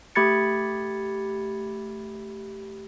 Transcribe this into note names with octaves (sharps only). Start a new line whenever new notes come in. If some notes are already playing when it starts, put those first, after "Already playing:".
A3 G4 B5 G#6 A6 C#7